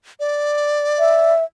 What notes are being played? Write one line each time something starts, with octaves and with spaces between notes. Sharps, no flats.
D5
E5